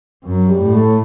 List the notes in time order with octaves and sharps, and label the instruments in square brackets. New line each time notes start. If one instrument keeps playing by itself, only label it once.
[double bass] F#2 [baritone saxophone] F#3
[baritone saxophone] G3
[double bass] A2
[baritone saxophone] A3